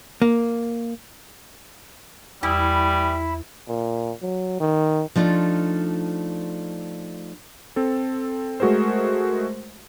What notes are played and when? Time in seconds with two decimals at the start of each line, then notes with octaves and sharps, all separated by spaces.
0.22 A#3
2.43 E2 E3 G3 E4 D#6
3.68 A#2
4.22 F#3
4.60 D#3
5.16 F3 A3 D4 D#4 F4
7.76 C4 A4
8.60 G#3 A3 F#4 G#4 A#4 C5